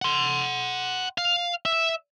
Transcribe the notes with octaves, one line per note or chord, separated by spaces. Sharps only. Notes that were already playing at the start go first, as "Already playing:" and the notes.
F#5 C6
F5
E5